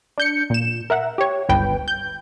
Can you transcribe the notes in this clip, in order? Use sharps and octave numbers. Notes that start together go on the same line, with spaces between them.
D4 G6 C#7
A#2 E7
A#4 E5 F#5
G4 C#5
G1 C#2 B4 G5
G6